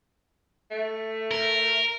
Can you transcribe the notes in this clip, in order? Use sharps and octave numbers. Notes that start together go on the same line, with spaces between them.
A3
A#4